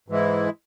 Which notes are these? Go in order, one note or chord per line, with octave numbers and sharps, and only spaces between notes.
G#2 E3 G#3 E4